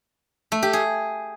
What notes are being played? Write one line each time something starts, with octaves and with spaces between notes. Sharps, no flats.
A3
G4
G#4